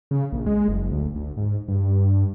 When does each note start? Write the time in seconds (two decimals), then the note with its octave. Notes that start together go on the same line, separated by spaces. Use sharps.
0.11 C#3
0.32 A#1
0.46 G#3
0.69 F#1
0.92 D2
1.15 D2
1.37 G#2
1.68 G2